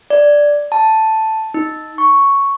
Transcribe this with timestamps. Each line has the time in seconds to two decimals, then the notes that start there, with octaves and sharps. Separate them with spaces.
0.10 D5
0.72 A5
1.54 D#4
1.98 C#6